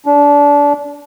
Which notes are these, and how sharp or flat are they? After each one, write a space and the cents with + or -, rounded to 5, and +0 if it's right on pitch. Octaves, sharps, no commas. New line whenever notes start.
D4 -25